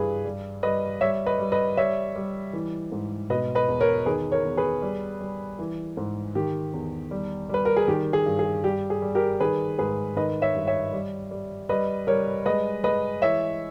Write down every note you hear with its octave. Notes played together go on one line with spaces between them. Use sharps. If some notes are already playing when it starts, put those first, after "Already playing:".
Already playing: G2 E3 G#4 B4
G3
G3 B4 D#5
G3 C#5 E5
B4 D#5
G3
B4 D#5
G3 C#5 E5
G3
E3
G#2
B2 B4 D#5
B4 D#5
E2
A#4 C#5
D#3 G#4 B4
A#4 C#5
E2
G#4 B4
G3
G3
E3
G#2
D#3 G4
E2
G3
G3 B4
A#4
G#4
D#3 G4
G#4
G2
G#4
G3 G4
G#4
G3
G4 A#4
D#3 G#4 B4
G#2 G#4 B4
D#3 B4 D#5
C#5 E5
G2
C#5 E5
G3
G3
G3 B4 D#5
G3 A#4 C#5
G#3 B4 D#5
G#3 B4 D#5
E3 C#5 E5